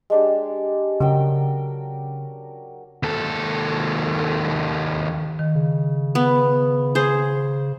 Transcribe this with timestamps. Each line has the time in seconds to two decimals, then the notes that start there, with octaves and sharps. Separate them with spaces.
0.10 G#3 D4 G4
1.00 C#3 F#3 A#4 G5
3.03 D#2 A4
5.39 D#3
5.55 C#3
6.15 B3 F#5
6.95 G#4 C5